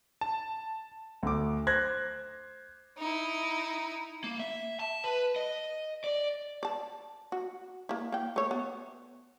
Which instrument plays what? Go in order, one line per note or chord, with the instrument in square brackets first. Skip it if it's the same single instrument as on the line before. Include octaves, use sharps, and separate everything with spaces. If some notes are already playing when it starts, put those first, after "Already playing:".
[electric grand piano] A5
[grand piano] D2 D6
C5 F#6 G#6 A#6
[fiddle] D#4 E4
[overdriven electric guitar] A#3
E5
A5
B4
D#5
D5
[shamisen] D5 A5
F#4
A#3 E4
A#3 G5
A3 C#5
B3